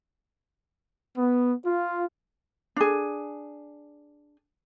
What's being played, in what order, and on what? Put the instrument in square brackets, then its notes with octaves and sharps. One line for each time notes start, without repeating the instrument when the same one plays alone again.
[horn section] B3
F4
[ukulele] D4 G#4